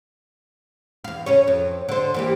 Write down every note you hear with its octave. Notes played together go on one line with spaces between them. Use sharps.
E2 F5
C#3 C#4 C#5
F2
D3 C5
E3 A#3 G4